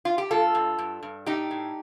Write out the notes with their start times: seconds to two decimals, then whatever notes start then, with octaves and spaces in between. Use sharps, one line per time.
0.05 F4
0.18 G4
0.31 G2 F4 A4
0.55 G2
0.79 G2
1.03 G2
1.26 A2 D#4 G4
1.51 A2